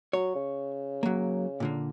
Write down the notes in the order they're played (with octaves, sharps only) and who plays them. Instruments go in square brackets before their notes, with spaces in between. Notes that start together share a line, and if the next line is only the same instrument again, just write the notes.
[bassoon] F#3 [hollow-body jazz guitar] C#5
[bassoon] C#3
[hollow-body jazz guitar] F#3 A#3
A#2 D3 A#3